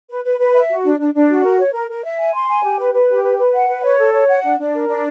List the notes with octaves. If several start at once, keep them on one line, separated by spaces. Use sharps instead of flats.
B4
B4
B4
E5
F#4
D4
D4
D4
F#4
A#4
C#5
A#4
A#4
E5
G#5
C6
G#5
G4
B4
B4
G4
B4
B4
F#5
B4
C#5
A4
C#5
F#5
D4
D4
A#4
D4